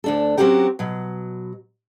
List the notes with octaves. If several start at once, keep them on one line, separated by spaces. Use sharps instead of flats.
D2 D4 A4
F#3 C4 C#4 F#4 G4 A#4
B2 F#3